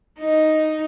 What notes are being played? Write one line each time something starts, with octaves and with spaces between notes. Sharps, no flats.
D#4